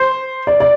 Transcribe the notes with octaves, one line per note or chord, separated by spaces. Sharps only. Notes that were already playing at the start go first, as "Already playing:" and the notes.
Already playing: C5
D5
D5